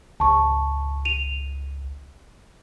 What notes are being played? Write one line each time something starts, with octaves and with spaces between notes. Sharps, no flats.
G#1 C#2 A5 C#6
D#7 F7